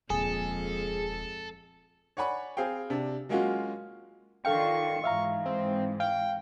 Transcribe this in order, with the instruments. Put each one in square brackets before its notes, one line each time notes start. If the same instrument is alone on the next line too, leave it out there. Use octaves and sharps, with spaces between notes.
[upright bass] D#1 [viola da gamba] F2 G#3 [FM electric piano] G#4 [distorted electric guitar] A4
[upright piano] C#5 D5 F#5 G#5 B5 C#6
C4 G#4 F5 G5
C3 D4
F#3 G#3 A#3 C#4 F4 F#4
[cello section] D#3 D4 F4 [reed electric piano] A4 F5 G5 [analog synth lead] C#6
[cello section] G#2 E3 [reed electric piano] E5 F5 A#5
[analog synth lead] C4
[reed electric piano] F5 [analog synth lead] G5